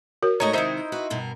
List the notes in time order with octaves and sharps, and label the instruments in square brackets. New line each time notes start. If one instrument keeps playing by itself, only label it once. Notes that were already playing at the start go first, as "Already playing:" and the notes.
[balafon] F#4 A#4 C#5
[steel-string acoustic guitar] G#2 A3 D#5 [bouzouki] D#4 C#5 [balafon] A#5
[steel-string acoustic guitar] C3 D#3 G#3 [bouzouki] D#4 E4 C5
[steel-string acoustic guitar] F#4 B4 E5
G2 B2 A#4